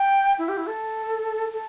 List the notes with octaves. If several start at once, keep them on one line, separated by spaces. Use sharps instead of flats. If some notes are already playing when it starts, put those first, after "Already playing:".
Already playing: G5
E4
G4
E4
A4
A4